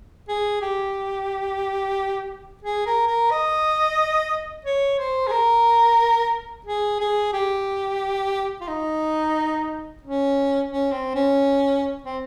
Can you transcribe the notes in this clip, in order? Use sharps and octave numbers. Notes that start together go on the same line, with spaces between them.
G#4
G4
G#4
A#4
A#4
D#5
C#5
C5
G#4
A#4
G#4
G#4
G4
F4
D#4
C#4
C#4
C4
C#4
C4